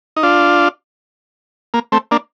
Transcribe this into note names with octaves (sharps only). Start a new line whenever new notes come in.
D#4
D4 F4
A#3
A3 C4
A#3 D4